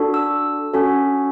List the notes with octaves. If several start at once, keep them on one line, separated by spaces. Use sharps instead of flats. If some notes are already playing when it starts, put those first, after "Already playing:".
Already playing: D4 F#4 A4
E6
C#4 F#4 A4